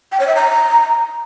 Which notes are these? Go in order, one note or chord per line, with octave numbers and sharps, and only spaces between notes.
G5
C#5
E5
A#5